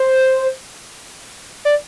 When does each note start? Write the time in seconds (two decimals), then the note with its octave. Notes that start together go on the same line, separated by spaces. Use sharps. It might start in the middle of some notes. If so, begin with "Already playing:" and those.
Already playing: C5
1.65 D5